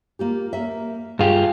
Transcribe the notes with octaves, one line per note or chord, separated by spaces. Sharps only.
A#3 F4 G4
A#3 E5
G2 F4 G4 G#4